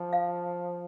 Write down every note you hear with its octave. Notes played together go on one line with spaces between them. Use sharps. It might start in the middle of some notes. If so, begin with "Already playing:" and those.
Already playing: F3
F5